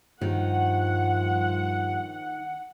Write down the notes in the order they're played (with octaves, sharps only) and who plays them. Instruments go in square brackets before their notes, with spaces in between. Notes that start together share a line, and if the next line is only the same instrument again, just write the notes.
[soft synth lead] G2 [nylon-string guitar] D#3 [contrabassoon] F3 [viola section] F#5